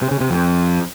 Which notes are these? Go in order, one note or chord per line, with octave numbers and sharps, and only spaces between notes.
C3
C#3
C3
F2